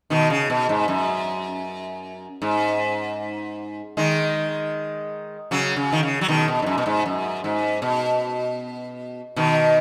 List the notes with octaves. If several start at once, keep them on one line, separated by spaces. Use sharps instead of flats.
B2 D#3
C#3
B2
G#2
F#2
G#2
D#3 G#3
C#3 F#3
C#3
D#3
C#3
F#3
B2 D#3
B2
G#2
F#2
B2
G#2
F#2
G#2
B2
B2 D#3